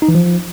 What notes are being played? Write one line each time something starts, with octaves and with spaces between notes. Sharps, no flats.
D#4
E3
F3